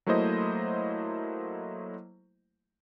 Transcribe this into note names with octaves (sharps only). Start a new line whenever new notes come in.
F#3 A3 A#3 E4 C5 D#5